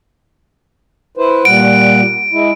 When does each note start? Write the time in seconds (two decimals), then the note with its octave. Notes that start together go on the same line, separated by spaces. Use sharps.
1.17 E4 B4 C5
1.45 A#2 G3 F#5 D7
2.33 G#3 E4